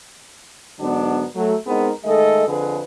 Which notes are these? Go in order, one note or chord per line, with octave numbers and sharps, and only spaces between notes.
G#2 D3 F#3 B3 D4 D5
F#3 A3
G#3 B3 C4 D#4 G#4 A#4
D#3 G#3 A3 A4 D#5
F2 D3 G#4 B4